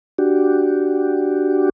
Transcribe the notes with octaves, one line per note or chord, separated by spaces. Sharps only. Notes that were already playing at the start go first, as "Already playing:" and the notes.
D4 F#4 G4